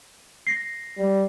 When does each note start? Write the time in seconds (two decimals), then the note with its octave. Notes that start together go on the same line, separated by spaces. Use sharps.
0.47 A#6 C7
0.98 G3